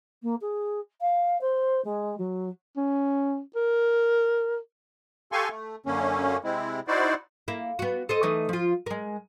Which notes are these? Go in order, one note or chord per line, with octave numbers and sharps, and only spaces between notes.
A#3
G#4
F5
C5
G#3
F#3
C#4
A#4
G4 A4 F5 G#5 C6 C#6
A3
F#2 D3 A#3 C#4
C3 G#3 C4 E4
D#4 E4 F#4 C5 D5
A#3 E4
B3 F#4
A4 C5 D#5
E3 A3 D#4
F3 F4
G#3 A#4